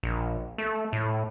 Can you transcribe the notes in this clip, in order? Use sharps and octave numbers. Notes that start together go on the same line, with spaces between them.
A#1
A3
A2